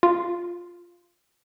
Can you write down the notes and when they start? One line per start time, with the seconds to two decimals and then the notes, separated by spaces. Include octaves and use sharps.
0.03 F4